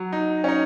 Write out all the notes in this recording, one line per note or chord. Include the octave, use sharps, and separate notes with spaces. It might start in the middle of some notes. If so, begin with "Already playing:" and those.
Already playing: F#3
D#4
C#4
D#4